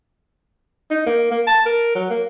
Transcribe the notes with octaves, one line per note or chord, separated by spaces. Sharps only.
D#4
A#3
A#3
A5
A#4
F#3
A#3